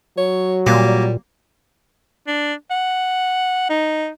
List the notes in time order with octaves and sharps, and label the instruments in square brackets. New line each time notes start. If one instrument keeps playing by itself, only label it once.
[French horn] F#3 [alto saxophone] C#5
[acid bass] A#2 [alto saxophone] G3 [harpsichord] A#3
[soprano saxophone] D4
F#5
D#4